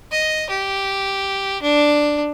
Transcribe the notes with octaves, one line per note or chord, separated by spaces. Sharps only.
D#5
G4
D4